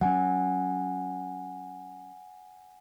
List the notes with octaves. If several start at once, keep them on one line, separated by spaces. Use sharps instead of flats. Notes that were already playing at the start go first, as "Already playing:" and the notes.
F#3 C#4 F#5 G#5